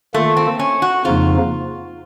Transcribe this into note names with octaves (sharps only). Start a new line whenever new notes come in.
D#3 A3 A#3 F4 A4
C4
C#4
F#4
F2 C#3 F3 A#3 D#4 F4